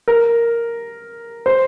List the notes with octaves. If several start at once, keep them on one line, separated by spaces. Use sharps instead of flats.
A#4
C5